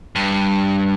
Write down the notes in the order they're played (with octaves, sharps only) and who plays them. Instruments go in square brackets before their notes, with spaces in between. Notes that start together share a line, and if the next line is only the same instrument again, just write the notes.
[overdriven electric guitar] G2